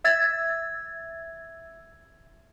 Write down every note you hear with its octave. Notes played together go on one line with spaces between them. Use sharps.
E5 E6 G#6 A6